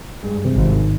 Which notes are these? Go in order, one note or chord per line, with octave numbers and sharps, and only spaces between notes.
G2 G#3
C3
G#1 G#2
D#3